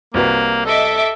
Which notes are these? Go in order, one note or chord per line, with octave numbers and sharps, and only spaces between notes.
C2 A#3 F#4 B4
A4 D#5 E5 D6